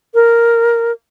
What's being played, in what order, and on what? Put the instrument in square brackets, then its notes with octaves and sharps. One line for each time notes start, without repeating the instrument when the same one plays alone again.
[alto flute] A#4